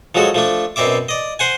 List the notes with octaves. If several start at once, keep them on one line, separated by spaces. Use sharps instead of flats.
F3 F#3 G#3 F#4 A4
F3 A3 D4
F#2 B2 C4 D5 E5 D6
D5 D#5
C5 F#5 G#5